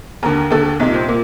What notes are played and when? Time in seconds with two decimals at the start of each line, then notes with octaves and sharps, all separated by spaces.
0.23 D#2 D3 A#4
0.51 D#2 D3 A4
0.80 C2 A#2 D#4
0.94 C4
1.08 A#2 A#3